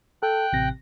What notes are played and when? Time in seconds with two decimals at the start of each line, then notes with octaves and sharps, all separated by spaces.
0.23 A4 G5 F#6
0.53 A1 C3 A#6